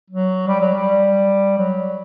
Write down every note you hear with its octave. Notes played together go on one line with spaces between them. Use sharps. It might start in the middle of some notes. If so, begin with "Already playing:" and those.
F#3
G3
F#3
G3
F#3